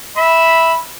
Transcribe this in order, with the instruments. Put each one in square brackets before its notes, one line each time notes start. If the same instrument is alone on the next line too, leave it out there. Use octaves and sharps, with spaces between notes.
[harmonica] E5 [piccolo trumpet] B5